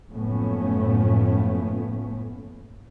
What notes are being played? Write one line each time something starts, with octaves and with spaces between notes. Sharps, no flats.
F#1 A2 F3 A3 B3 C#4